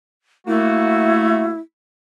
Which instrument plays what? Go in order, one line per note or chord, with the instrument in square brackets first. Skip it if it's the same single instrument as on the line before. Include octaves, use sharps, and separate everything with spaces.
[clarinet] A3 [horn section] A#3 F#4 [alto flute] E4